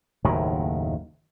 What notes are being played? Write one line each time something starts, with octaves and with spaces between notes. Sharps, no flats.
F#1 D#2 A2 D#3